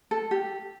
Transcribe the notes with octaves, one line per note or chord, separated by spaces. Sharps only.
A4
G4